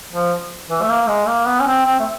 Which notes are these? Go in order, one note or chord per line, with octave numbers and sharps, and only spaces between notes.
F3
E3
A3
A#3
G#3
A#3
B3
C#4
C4
C4
A3